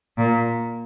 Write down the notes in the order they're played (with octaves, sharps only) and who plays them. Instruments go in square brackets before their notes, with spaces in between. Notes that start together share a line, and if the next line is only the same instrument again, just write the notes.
[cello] A#2